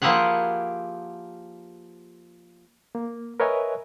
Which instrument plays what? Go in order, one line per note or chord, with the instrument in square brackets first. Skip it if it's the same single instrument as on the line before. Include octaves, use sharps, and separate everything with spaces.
[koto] F3 A#3 E4 G4 G#4 F#5
[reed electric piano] A#3
A#4 B4 C#5 D#5 E5 G#5